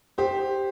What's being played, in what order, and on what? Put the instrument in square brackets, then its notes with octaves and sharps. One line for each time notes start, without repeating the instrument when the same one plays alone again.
[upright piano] G4 C5